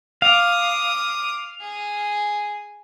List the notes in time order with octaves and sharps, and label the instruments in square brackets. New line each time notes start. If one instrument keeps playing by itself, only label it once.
[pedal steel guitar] F5 [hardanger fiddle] D6 D#6
[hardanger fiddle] G#4